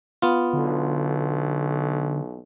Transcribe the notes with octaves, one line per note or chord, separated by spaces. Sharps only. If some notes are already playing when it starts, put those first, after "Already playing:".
B3 F4
B1 D3